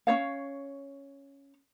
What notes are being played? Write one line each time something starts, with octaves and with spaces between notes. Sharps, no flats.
C#4 D#4 C#5 F5